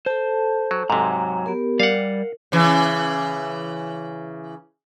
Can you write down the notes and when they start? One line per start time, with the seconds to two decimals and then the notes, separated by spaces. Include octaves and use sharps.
0.06 A4 C5 A5
0.71 F#3
0.90 G#2 C3 F#3 A#5
1.46 B3 G4 A#4
1.80 G3 A#4 D5 F5 F#5
2.52 C#3 E3